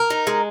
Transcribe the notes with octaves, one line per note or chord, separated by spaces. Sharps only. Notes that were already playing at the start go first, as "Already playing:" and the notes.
Already playing: A#4
D#4
G#3